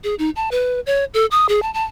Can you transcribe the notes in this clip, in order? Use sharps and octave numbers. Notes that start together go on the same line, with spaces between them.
G#4
D#4
A5
B4
C#5
A4
D#6
G#4
A5
A5